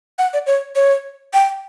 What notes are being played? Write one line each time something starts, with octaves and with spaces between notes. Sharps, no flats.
F#5
D5
C#5
C#5
G5